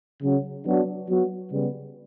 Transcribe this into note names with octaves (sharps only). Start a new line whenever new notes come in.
C#3 F#3 C#4 F#4
F#3 B3 D4 F#4
F#3 B3 F#4
C#3 G3 B3